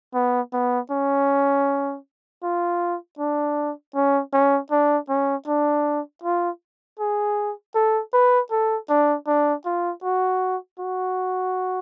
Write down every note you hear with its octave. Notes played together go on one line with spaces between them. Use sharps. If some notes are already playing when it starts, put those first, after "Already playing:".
B3
B3
C#4
F4
D4
C#4
C#4
D4
C#4
D4
F4
G#4
A4
B4
A4
D4
D4
F4
F#4
F#4